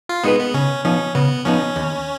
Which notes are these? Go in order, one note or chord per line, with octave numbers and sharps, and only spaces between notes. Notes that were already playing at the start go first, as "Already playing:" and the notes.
F4
G#3 B3 D#4 G#4 B4
B3
C#3 C#4
F3 B3 C#4 D#4
C#3 B3
F3 B3 C#4 D#4
D#2